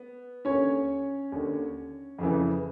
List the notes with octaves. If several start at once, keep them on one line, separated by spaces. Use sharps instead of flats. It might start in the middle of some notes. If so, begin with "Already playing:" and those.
Already playing: B3
D#2 D3 C#4 C#5
D#2 D3
F2 C#3 E3